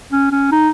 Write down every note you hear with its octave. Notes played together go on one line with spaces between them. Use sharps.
C#4
C#4
D#4